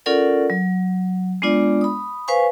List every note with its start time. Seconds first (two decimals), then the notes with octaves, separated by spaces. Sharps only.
0.06 C#4 F4 A4 A#4 D5 F#5
0.50 F#3
1.42 G#3 B3 D4 F4 D5
1.81 B5 D#6
2.28 B4 C5 F5 G#5 C#6